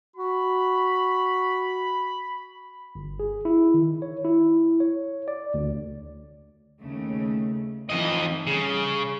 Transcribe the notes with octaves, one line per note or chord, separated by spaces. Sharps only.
F#4 B5
G1
G#4
E4
D#3
C#5
E4
C#5
D5
D2
D#2 C#3 A3
F2 E3 D#4 D#5
C#3 G3 G#4